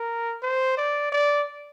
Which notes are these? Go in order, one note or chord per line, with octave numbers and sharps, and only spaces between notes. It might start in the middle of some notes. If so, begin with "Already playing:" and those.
Already playing: A#4
C5
D5
D5